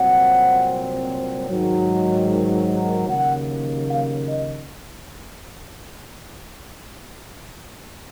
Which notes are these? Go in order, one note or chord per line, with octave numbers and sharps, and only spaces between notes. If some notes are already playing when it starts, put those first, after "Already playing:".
Already playing: C2 A#2 F#3 C4 F#5
G#2 D#3 F#3
D#2 C#3 F#3 A#3 F#5
F5
D#5